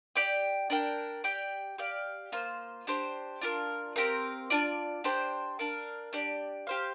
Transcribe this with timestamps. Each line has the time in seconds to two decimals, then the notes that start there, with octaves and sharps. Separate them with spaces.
0.16 G4 D5 G5
0.70 D4 A#4 G5
1.24 G4 D5 G5
1.78 G4 D5 F5
2.32 A#3 F4 C5
2.87 D4 G4 C5
3.41 D4 F4 A#4
3.96 C4 G4 A#4 F5
4.50 D4 F4 D5
5.04 D4 G4 C5 G5
5.59 D4 A#4 F5
6.13 D4 G4 D5
6.67 G4 C5 F5